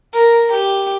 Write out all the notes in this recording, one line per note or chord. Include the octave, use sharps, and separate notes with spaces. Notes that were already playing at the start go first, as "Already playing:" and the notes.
A#4
G4